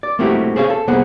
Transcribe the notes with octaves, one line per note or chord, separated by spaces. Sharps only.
D5
A3 A#3 C4 E4 F#4 G4
G#4 C5 C#5 D#5 F5
A4
C2 A#3 B3 G#4 C5 F#5